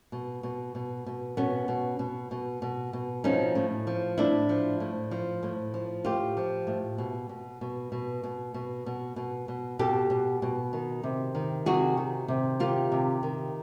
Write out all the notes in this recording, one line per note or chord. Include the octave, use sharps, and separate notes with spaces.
B2
B2
B2
B2
B2 B3 C#4
B2
B2
B2
B2
B2
F3 C#4 D#4
A2
F3
A2 D4 E4
F3
A2
F3
A2
F3
A2 F4 G4
F3
A2
B2
B2
B2
B2
B2
B2
B2
B2
B2
B2 G4 A4
B2
B2
D#3
C3
D#3
C3 F#4 G#4
D#3
C3
D#3 F4 G4
C3
D#3